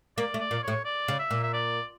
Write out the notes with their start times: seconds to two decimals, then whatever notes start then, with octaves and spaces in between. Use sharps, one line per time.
0.17 A#3 D5
0.34 A3
0.40 D5
0.51 A#2
0.63 A2 C#5
0.85 D5
1.08 C#3
1.19 E5
1.30 A#2
1.43 E5
1.54 D5